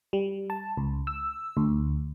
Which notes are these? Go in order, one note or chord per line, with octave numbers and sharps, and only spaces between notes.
G3
A5
C#2
E6
D2